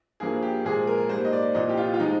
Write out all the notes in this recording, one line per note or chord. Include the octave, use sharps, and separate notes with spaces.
G2 F3 A#3 G#4
G4
A#2 F3 G#3 G#4
A#4
G#2 G3 A#3 C5
D#5
D5
C2 A#2 F3 D#5
G4
F4
F4
F3 G#3 D#4